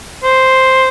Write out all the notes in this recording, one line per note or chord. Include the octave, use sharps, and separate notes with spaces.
C5